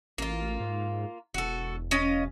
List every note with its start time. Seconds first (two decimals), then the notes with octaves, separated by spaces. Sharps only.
0.18 A1 A#3 F4
0.60 G#2
1.34 E1 F#4 A4
1.91 C#4 D#5 F5